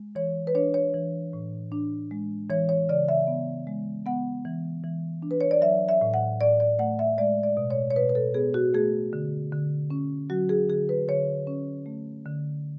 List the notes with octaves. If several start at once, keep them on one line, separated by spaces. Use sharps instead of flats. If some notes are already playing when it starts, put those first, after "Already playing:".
Already playing: G#3
E3 C#5
B4
D4 C#5
C#5
E3
A2
D4
G#3
E3 C#5
C#5
C#3 D5
E5
B3
G#3
B3 F#5
E3
E3
D4
B4
C#5
D5
F#3 E5
E5
A2
F#5
A2 D5
D5
A3 F#5
E5
G#3 D5
D5
B2
C#5
C#5
B2 B4
B4
A4
B3 G#4
F#4
A3 G#4
D3
D3
C#4
F#3 F#4
G#4
D3 G#4
B4
D3 C#5
C#4
A3
D3